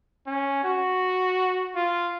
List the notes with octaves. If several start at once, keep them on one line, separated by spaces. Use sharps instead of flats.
C#4
F#4
F4